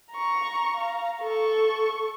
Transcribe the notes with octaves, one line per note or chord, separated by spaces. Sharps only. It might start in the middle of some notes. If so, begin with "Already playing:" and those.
A#5 C#6
F5 A#5
A4 C#6